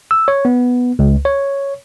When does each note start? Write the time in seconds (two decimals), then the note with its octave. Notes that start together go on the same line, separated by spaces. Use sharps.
0.11 E6
0.28 C#5
0.45 B3
0.99 C#2
1.25 C#5